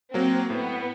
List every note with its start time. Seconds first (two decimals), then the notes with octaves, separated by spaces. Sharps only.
0.13 F#3 A#3 C4
0.50 A2 B3